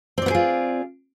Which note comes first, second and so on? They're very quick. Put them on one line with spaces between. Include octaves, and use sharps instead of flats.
C4 D5 B3 G#4 F4